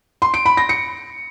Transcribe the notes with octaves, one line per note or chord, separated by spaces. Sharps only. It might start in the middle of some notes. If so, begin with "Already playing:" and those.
C6
D7
B5
A#6
C#7